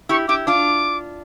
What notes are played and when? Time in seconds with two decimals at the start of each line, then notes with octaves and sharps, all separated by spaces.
0.09 E4 G4 C#6
0.28 E4 G4 D6
0.47 D4 F4 D6